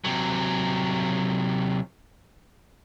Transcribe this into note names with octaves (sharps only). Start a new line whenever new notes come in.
C3 F#3